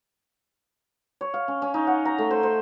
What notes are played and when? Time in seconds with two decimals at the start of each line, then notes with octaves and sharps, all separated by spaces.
1.21 C#5
1.34 F5
1.48 C#4
1.62 C#4
1.74 D#4
1.87 F#5
2.05 A#5
2.18 A3
2.31 C5
2.43 C5